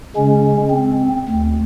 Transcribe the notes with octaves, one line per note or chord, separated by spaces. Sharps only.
C#3 G#3 C#4
C4
D2